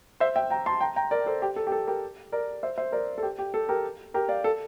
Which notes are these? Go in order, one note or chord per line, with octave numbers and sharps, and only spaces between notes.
C5 E5
E5 G5
G5 A#5
A5 C6
G5 A#5
G5 A#5
A#4 D5
A4 C5
G4
A4
G4
A4
G4 A#4
A#4 D5
C5 E5
C5 E5
A#4 D5
A4
G4
G4
A4
G4 A#4
G4 A#4
D5 F5
A4